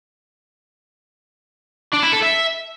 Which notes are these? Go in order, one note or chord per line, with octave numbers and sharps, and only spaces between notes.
D4
E4
A4
E5